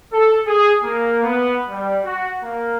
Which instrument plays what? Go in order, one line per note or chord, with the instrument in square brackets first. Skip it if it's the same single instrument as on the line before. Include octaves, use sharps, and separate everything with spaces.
[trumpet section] A4
G#4
A#3
B3
G3
F#4
A#3